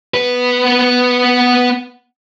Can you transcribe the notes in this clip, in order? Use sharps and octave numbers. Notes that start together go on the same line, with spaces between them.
B3 B4